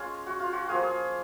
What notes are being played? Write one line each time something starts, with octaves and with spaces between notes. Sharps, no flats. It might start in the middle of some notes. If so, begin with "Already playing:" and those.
Already playing: G#3 A#3 C#4 F4
F#4
F4
F#4
F3 A#3 F4 G#4
G#4